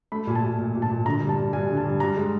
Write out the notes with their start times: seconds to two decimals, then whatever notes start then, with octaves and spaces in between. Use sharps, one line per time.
0.12 A3 B5
0.27 A#2 G#5
0.35 A5
0.43 A#2
0.59 A#2
0.75 A#2
0.82 A5
0.90 A#2
1.05 D3 A#5
1.22 G2
1.29 A5
1.38 G2
1.53 G2 G#5
1.69 D3
1.77 A5
1.84 G2
2.00 G2 A#5
2.17 G#3